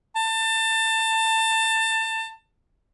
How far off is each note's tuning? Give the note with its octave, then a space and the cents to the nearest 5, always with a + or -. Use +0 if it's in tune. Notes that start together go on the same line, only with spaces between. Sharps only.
A5 +25